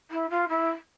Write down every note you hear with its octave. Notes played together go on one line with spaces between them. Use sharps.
E4
F4
E4